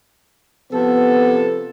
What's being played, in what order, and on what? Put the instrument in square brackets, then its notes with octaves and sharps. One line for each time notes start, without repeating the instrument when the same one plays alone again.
[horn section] C3 F3 A4 [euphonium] B3